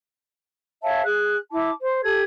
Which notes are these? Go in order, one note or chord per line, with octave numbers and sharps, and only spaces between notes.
C#5 E5 F5 A5
G#4 F#6
E4 A5 D6
C5
G4 A4 G#6